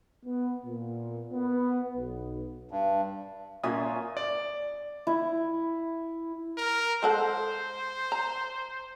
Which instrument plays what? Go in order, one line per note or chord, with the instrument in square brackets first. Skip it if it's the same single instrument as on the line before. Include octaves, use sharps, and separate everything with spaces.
[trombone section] B3
A#2
B3
B1
[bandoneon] G2
[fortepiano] A#2 G#5 D#6 [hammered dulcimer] C#4 F4 [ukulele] E5
[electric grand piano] D5
[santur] E4
[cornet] A#4
[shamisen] G#3 A4 F#5 [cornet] C5
[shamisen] A#5